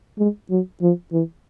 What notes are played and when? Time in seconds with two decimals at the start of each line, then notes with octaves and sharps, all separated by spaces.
0.19 G#3
0.51 F#3
0.82 F3
1.12 E3